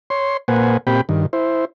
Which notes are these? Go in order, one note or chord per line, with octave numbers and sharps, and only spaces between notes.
C#5 C6
A#2 A#3 B4 C5 F#5 G#5
A#2 C4 G4 G5 B5
G2 D#3
E4 C5